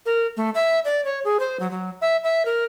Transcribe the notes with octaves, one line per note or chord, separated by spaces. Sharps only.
A#4
A3
E5
D5
C#5
G#4
C5
F#3
F#3
E5
E5
A#4